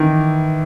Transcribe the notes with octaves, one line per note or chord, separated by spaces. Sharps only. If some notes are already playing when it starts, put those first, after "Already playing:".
Already playing: D#3 E3